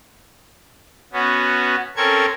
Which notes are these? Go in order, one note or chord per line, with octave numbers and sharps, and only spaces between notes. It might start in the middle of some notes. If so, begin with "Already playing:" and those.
B3 C#4 F#4
C4 C#4 A4 A#4 C#6 G#6